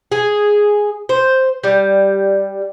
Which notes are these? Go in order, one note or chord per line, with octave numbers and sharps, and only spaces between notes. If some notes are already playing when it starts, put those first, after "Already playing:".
G#4
C5
G3